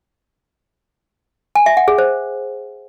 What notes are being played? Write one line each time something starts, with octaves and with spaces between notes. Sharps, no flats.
G#5
E5
F#5
G#4
C5